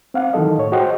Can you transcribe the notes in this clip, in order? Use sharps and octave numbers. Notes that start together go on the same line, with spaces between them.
C4 F5 F#5
D#3 E3 F#3 A4 D#5
A2 C#5
F#4 G#4 C5 D#5 F#5 G5